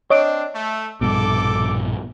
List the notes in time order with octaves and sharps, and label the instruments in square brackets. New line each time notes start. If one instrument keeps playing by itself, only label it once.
[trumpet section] C4 D4 [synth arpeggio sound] C#5 D#5 D7
[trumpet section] A3
[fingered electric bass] A#1 G2 B2 [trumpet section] A4 D6